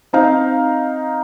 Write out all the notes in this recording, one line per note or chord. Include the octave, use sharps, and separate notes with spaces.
C4 D#4 F5